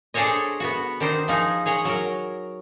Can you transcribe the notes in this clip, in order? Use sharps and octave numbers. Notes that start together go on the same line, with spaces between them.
D4 G#4 A4 C5 C#5 D#5
B3 F#4
D#3 D4 D#4 C5
F3 D#4 G#4
G#4 C#5 D#5 F#5
F#3 A#4